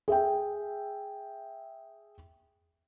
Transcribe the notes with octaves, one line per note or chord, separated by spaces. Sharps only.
G#4 E5 G5